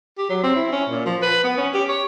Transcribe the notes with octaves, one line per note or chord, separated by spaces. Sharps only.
G4
F#3
C4
E4
C#4
A#2
F3
B4
B3
C#4
G4
C#5